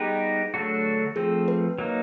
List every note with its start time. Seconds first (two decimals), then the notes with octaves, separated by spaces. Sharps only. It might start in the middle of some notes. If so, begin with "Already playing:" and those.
Already playing: G3 B3 D#4 G4 G#4 B4
0.54 D3 F#3 A3 D4 F#4
1.16 F3 A3 C4 G#4
1.48 B4
1.78 F#3 A#3 D#4